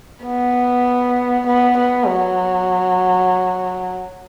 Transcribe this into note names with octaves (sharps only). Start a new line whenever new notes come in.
B3
B3
B3
F#3